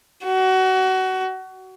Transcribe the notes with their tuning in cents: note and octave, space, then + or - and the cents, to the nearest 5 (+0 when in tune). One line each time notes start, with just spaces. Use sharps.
F#4 +25